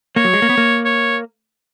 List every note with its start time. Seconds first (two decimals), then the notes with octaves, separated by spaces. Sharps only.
0.16 A#3 C#5
0.25 F#3
0.33 G#3
0.42 A#3
0.49 B3
0.58 A#3
0.85 C#5